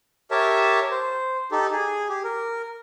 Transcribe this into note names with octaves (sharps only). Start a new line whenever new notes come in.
G4 A#4 C#5 E5 A5
C5
D#4 G4 A4
G#4
G4
A#4